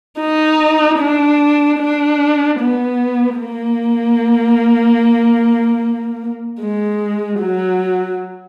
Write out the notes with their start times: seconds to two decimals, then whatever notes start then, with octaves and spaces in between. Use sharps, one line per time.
0.19 D#4
1.00 D4
1.79 D4
2.60 B3
3.39 A#3
6.60 G#3
7.39 F#3